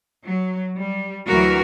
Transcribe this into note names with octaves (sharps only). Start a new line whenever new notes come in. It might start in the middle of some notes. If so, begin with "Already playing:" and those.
F#3
G3
D2 E3 F#3 F#4 A#4